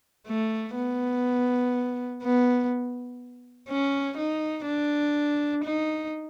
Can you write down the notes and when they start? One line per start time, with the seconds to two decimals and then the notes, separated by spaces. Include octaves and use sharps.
0.28 A3
0.76 B3
2.23 B3
3.69 C#4
4.17 D#4
4.66 D4
5.64 D#4